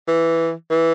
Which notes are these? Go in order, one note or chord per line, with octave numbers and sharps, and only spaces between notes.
E3
E3